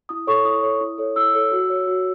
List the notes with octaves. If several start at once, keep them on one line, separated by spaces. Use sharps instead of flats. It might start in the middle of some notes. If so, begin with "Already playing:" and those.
E4 D#6
A4 C#5 C#6
E4 D#6
A4 C#5
E4
A4 C#5
E4 E6
A4 C#5
F#4
C#5
F#4